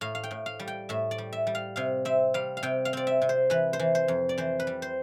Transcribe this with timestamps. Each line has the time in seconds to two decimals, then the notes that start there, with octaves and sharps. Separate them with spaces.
0.01 A2 F5
0.15 F5
0.24 G5
0.31 A2
0.46 F5
0.60 G3
0.68 G5
0.89 A2 E5
1.11 D5
1.18 G3
1.33 E5
1.47 G3
1.55 F5
1.76 C3 F5
2.05 C4 E5
2.34 G3 F5
2.57 F5
2.63 C3 G5
2.85 F5
2.93 C4 D5
3.07 E5
3.22 C3
3.29 C5
3.50 E3 B4
3.73 C5
3.79 E3
3.95 C5
4.08 F2
4.29 D5
4.38 E3 C5
4.60 B4
4.67 G3
4.82 C5